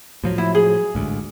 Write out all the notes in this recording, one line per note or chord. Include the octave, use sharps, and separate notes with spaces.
A2 F3 F#3
E4
G#4
A1 D2 G#2